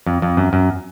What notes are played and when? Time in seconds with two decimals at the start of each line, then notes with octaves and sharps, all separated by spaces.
0.06 F2
0.22 F2
0.37 F#2
0.53 F#2